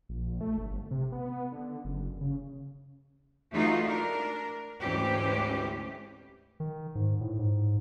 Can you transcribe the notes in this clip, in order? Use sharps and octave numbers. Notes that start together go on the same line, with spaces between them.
A#1
A3
G1
C3
B3
D3
F#1
C#3
E3 G#3 A3 D#4 F4 F#4
D4 A#4
D2 G#2 E3 C4 C#4 G4
D#3
G#2
A2
G#2